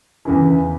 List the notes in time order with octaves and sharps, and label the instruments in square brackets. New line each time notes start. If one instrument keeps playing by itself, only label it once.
[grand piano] E2 C#3 E3